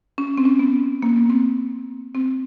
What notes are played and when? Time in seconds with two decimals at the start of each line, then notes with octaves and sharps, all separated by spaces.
0.18 C#4
0.38 C4
0.45 C#4
0.59 B3
1.02 A#3
1.16 B3
1.30 C4
2.15 C4